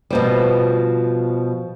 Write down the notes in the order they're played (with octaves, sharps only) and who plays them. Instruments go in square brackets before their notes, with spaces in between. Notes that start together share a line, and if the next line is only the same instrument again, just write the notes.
[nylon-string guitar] B2 F3 G3